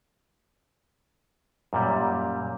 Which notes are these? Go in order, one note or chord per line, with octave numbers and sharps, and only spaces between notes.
F#2 A#2 G3